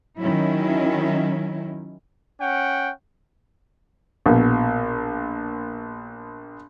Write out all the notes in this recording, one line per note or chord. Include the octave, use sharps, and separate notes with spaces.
D#3 F#3 C#4 E4
C#4 F#5 G5
A#1 B2